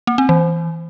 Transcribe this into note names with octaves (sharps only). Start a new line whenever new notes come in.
A#3
C4
E3